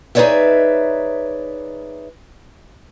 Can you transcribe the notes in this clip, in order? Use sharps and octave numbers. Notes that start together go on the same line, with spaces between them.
D#4 G#4 B4 C#5 D5 E5